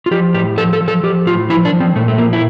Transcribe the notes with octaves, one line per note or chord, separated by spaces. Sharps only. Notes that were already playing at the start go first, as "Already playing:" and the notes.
F4
F3 G4
A2 G4
F3 A4
A4
F3
A4
F3 G4
A2 F4
F3 E4
D4
F3
C4
A#2 A3
A3
F3 A#3
E4